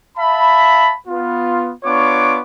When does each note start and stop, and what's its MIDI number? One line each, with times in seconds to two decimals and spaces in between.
0.17 0.93 76
0.17 0.93 77
0.17 0.93 81
0.17 0.93 83
1.07 1.72 59
1.07 1.72 65
1.85 2.41 59
1.85 2.41 62
1.85 2.41 65
1.85 2.41 73
1.85 2.41 85
1.85 2.41 86